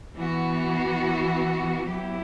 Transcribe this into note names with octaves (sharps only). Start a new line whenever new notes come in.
E3 B3 F#4
F#3 B3 E4 G4